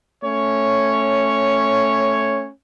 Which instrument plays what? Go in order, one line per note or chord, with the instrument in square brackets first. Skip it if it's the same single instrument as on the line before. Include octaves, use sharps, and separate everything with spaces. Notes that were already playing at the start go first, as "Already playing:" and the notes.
[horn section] A3 C#4 C#5